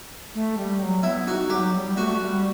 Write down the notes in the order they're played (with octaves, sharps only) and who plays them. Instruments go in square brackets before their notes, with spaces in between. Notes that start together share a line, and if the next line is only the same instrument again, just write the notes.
[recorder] A3
G3
F#3
[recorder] B3 [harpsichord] E4
[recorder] D#4 [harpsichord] F#4
[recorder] G3 [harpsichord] G4
[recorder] F#3
G3
[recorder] A3 B3 [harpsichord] F#4
[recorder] G3